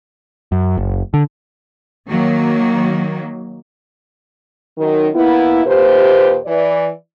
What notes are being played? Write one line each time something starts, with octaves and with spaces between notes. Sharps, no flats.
F#2
F#1
D3
D#3 F#3 A#3
F#2 D#3
A#3 B3 E4
D#2 A#2 G4 B4 C5
E3 D5